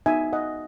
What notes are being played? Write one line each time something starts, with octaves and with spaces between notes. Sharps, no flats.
B3 D#4 F#4 E5 G#5
D#5 F#5